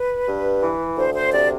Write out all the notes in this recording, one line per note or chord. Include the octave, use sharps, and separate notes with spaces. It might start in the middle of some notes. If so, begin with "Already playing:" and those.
Already playing: B4
G2
E3
D2 C5
C5
C3 D5